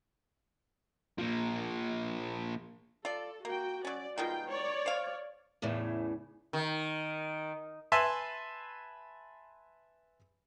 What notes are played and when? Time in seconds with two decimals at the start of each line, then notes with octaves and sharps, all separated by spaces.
1.18 F3 A#3
3.05 F4 A4 D5
3.45 A#3 F#4 G5
3.85 F#3 C#4 D5
4.18 B2 D#3 G#3 F4 G5
4.50 C#5 D5
4.86 C5 F5
5.62 E2 A2 C#3 E3
6.53 D#3
7.92 B4 E5 G#5 A5 B5 C6